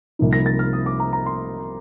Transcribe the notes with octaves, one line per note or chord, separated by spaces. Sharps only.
C2 C3 F3 A#3 D#4
A#6
A6
F6
D#6
D6
A#5
A#5
C6